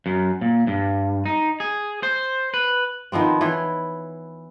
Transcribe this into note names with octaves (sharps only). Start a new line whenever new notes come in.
F#2
A#2
G2
D#4
G#4
C5
B4
D#3 F3 B3 C4
E3 C#5